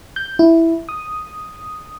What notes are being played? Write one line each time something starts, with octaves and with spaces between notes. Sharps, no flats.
G6
E4
D#6